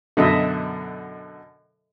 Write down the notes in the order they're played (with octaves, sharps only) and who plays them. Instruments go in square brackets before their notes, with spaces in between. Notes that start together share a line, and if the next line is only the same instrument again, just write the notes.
[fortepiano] F#2 B2 D3 [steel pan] A4 D#5 E5